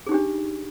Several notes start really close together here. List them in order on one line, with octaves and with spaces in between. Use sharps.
G#4 D#4 G4 D4